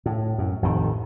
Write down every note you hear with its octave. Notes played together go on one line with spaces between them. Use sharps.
A2
F#2
A1 F2 D#3